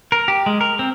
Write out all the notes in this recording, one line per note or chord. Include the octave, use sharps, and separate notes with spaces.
A#4
G4
G#3
A#4
C4